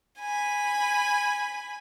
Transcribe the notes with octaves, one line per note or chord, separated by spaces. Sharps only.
G#5 B5